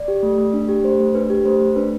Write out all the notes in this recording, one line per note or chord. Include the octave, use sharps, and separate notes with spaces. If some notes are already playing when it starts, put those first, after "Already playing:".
Already playing: D5
G4
A3
A3
D4
G4
A3 C5
A3
D4 B4
G4
A3 C5
A3
D4 B4